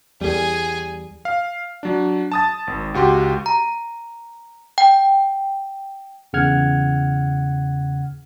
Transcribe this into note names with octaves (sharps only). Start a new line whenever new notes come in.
E2 G3 G#4 G#5
F5
F#3 D4
A5 D#6 A6
G#1
C#2 F#4 G4 C6
A#5
G5
E2 C#3 F#5 F6 G#6